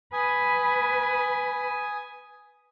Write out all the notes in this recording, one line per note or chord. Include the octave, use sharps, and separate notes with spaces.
B4 G#5 D#6